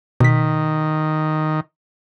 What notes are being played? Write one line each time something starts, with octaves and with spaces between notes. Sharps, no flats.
B2 D#3 B6